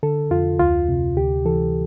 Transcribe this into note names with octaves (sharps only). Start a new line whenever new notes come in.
D3 A4
F2 F4
D2 F4
C3
D2 G4
E3 A4